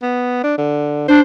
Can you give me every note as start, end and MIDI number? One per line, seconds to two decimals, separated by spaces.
0.02 0.42 59
0.43 0.57 62
0.58 1.08 50
1.08 1.20 62
1.08 1.21 72